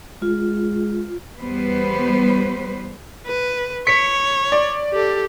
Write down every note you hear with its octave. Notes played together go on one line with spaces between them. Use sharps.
G#3 F4
E2 G3 B3 B4 C5
B4
C#5 B6 C#7
D5
G4 A4